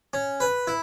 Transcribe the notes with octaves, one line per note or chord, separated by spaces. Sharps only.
C#4
B4
E4